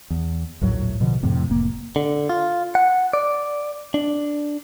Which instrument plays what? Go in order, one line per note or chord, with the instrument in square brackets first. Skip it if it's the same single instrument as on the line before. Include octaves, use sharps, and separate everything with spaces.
[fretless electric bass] E2
A#1 D#2 A2 F#3
B2 D3 F3
F2 A2 C3
F1 A#3
[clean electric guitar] D3
F4
F#5
D5
D4